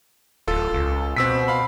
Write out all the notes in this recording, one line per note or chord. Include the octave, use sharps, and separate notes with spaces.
D1 F4 A4
C#2
B2 C4 E6 B6
F5 B5